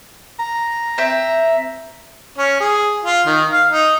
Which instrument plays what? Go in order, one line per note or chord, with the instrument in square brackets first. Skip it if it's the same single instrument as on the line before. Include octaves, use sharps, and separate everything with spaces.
[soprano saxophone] A#5
[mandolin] C4 E5
[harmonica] C#4
G#4
F4
D#3
F5
D#4